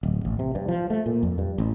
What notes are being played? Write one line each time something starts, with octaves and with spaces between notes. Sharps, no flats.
D1
A1
C3
G2
F3
A3
A#2
F2
G2
A1